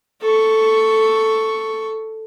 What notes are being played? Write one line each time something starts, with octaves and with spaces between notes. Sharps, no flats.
A4 C#6